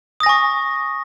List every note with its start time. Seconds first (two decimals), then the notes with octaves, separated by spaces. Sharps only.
0.20 D#6
0.23 A#6
0.26 G#5
0.29 C#6